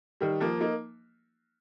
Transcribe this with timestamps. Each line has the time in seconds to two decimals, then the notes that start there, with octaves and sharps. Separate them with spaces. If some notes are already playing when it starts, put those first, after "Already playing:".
0.20 D#3 G3
0.40 F3 A#3
0.60 A#3 D#4